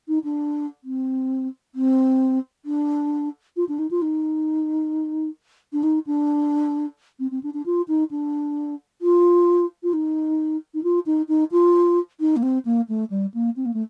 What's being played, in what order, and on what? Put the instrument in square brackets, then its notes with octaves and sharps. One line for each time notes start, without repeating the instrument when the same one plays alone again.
[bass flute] D#4
D4
C4
C4
D4
F4
D4
D#4
F4
D#4
D4
D#4
D4
C4
C4
D4
D4
F4
D#4
D4
F4
F4
D#4
D#4
F4
D#4
D#4
F4
D#4
A#3
C4
A#3
A3
G3
A#3
C4
A#3
A3